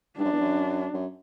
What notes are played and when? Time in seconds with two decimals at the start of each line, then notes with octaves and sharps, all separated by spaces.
0.17 G2 D4
0.25 F#2
0.33 E2
0.40 F#2
0.94 F#2